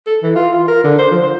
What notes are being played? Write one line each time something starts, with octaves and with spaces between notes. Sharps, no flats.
A4
E3
F4
F4
A#4
D3
C5
F3
C5